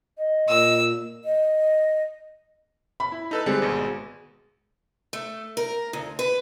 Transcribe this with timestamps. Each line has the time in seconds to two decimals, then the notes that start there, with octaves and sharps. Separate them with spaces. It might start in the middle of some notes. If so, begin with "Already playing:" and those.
0.18 D#5
0.49 A#2 E6
1.25 D#5
3.00 B5
3.12 E4
3.31 D#4 A4 B4
3.46 D3 G3 G#3 C4
3.62 G#1 B2
5.13 A3
5.57 A#4
5.93 D2
6.19 B4